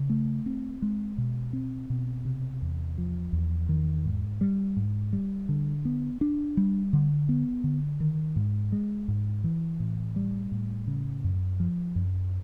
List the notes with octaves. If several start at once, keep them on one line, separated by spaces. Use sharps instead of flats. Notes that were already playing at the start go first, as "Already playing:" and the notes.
Already playing: C#3
A3
C4
G#3
B2
C4
B2
C3
E2
F3
E2
D#3
G#2
G3
G#2
G3
D3
B3
D4
G3
D3
B3
D3
D#3
G#2
G#3
G#2
E3
A2
G3
A2
C#3
F#2
F3
F#2